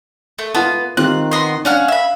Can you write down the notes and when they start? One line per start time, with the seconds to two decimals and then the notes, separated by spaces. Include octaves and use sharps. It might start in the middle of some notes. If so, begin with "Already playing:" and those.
0.39 A3
0.55 B3 F4 A5
0.97 D#3 C4 F4 G4 F#6
1.31 B3 D#5 C6
1.65 C#4 D4 F5 F#5 F6
1.88 E5 B5